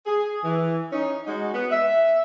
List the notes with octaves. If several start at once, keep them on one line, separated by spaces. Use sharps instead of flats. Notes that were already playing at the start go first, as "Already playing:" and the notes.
G#4
E3
C#4 D#4
G#3 D#4 F#4
B3
E5